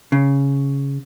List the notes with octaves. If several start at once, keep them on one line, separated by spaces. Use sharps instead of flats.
C#3